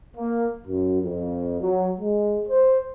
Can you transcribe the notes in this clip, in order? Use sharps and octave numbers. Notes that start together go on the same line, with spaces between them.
A#3
F#2
F2
F#3
G#3
C5